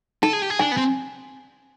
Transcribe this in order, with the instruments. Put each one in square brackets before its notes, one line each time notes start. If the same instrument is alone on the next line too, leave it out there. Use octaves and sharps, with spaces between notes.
[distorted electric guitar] A4 [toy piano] A5
[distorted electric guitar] G#4
G4
G#4
[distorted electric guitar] D4 [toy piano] G#5
[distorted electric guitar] B3
C4